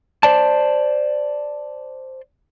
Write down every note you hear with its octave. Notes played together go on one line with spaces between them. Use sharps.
C5 D5 A5